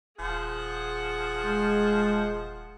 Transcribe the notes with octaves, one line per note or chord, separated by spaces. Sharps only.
D#1 F3 G#4 F#5
G#3